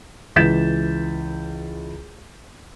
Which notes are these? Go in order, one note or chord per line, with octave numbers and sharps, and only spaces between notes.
C#2 E3 G6 A6 B6 E7